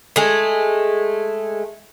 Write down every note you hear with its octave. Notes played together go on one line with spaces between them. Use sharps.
G#3 A3